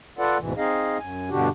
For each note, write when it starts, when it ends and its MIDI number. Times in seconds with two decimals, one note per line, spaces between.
0.18 0.38 65
0.18 0.38 69
0.18 0.38 71
0.18 0.38 74
0.18 0.38 78
0.39 0.53 38
0.39 0.53 44
0.39 0.53 47
0.39 0.53 52
0.57 0.98 60
0.57 0.98 63
0.57 0.98 68
0.57 0.98 75
0.57 0.98 77
0.99 1.30 42
0.99 1.30 80
1.30 1.49 43
1.30 1.49 47
1.30 1.49 50
1.30 1.49 62
1.30 1.49 66
1.30 1.49 67